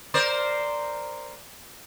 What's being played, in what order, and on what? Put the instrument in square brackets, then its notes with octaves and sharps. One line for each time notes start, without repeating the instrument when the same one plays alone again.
[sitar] A#4 C5 D5